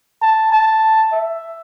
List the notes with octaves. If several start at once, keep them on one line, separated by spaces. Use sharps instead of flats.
A5
A5
E5